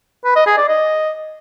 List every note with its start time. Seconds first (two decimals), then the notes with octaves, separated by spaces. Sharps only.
0.25 B4
0.36 D#5
0.47 G#4
0.58 D5
0.69 D#5